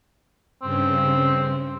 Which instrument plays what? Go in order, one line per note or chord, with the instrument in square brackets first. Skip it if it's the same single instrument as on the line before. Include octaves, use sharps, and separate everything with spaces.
[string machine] G2 C#3 [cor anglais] C4